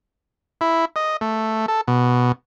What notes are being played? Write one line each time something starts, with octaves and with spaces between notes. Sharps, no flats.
E4
D#5
A3
A4
B2